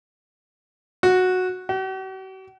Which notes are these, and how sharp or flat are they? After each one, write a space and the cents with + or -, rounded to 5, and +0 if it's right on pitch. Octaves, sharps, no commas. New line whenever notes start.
F#4 -10
F#4 +45